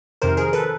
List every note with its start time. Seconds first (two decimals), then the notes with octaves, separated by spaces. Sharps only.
0.22 F2 C3 D#3 A#4 C5
0.37 G#4 A#4
0.53 A4 B4